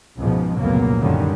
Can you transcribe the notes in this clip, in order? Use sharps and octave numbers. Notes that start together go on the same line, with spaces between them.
C#2 G#2 B2 F3
F1 C#2 A#2 F#3 A#3 B3
F#2 A#2 D3 D#3 G3 C#4